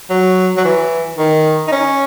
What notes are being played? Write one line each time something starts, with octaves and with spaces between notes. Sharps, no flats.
F#3
F#3
E3
D#3
D#4
C#4